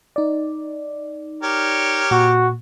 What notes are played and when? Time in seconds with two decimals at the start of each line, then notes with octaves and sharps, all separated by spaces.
0.16 D#4 D5
1.43 G4 A#4 C#5
2.11 A#2 F#4